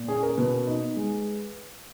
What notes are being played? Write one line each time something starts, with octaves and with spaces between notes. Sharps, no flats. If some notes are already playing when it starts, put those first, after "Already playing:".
Already playing: A#2
C#4 G#4
A#4
B2 B4
D#4
G#3